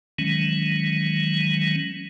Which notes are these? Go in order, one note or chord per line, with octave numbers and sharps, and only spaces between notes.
D#3 E3 F#3 G#3 C#4